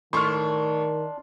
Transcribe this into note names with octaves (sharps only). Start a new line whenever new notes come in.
A2 D#3 D4 C6 C#6 F6